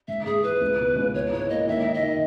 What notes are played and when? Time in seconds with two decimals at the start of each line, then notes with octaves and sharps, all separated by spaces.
0.08 G#2 E5
0.25 G#2 G#4
0.44 E3 B4
0.61 C#2
0.79 B2
0.96 C#2
1.14 G#2 C#5
1.32 E4 C#5
1.50 A#3 D#5
1.68 D#3 E5
1.86 D#3
1.94 D#5
2.03 D#3